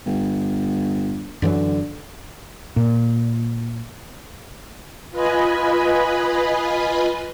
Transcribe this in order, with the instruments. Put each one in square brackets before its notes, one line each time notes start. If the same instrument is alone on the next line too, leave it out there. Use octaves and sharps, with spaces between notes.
[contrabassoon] G1
[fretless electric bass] F#2 E3 F#3 [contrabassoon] D3
[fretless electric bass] A#2
[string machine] F4 B4 D#5 G#5 B5